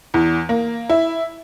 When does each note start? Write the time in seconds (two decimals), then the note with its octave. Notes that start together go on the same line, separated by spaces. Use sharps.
0.14 E2
0.49 A#3
0.89 E4